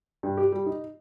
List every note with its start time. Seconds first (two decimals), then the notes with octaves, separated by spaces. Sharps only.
0.23 G2
0.37 G4
0.52 G3
0.66 D#4